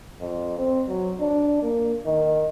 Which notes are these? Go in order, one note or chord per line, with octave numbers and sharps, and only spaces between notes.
F2
C4
F#3
D4
A#3
D#3